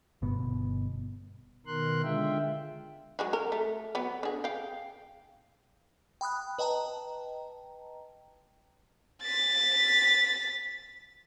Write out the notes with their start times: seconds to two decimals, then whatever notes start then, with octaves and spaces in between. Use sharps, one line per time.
0.22 G1 B2 B3
1.66 B2 D#3 A#4 C6 F#6
2.03 D3 G#3 F4 E5 G5
3.19 F#3 G#3 F#4
3.33 A#4
3.52 A3
3.95 F#3 B3
4.23 D3 G#4
4.44 F5 G5
6.21 G5 B5 D#6 F#6
6.59 B4 D#5 G5 A5 A#5
9.23 A6 B6